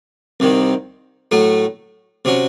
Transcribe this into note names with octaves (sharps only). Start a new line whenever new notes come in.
C2 C3 D#3
A2 F#3 A3
C3 F#3 C#4